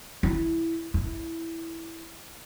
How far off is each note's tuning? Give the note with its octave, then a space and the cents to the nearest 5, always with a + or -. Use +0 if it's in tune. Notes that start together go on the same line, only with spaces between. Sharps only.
E4 +0
E4 +0